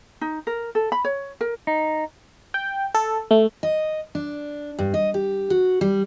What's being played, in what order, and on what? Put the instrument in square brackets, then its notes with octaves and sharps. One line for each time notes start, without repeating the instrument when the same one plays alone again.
[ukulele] D#4
A#4
A4
B5
C#5
A#4
[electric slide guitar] D#4
[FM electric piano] G5
A4
A3
[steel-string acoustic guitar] D#5
D4
G2
D#5
G4
F#4
G3